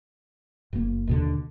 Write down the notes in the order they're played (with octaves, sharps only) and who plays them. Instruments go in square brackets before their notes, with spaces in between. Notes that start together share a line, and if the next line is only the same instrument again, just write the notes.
[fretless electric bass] F#1 A#3
D#2 B2 D3